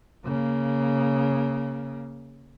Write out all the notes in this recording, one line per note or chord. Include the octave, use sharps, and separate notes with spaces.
C#3 A#3